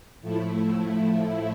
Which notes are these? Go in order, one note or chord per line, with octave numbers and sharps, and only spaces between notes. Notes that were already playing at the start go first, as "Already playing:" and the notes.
A2 F3 A3 E4